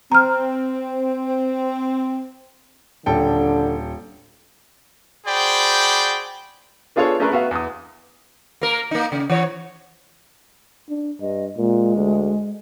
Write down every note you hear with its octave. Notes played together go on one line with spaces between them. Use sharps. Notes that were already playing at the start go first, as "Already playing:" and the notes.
C4 A#5 F6
D#1 D3 A4 G5
F#4 G#4 C5 D5 G5 B5
B3 D4 F4 G#4 A4 C#5
A3 C#4 D4 G#4 A#4 B4
B3 F#4 E5 F5
E2 D#6
A#3 A#4
A#3 D#4
C#3
E3 C#5
D4
G2 D#5
A#2 G#3
D2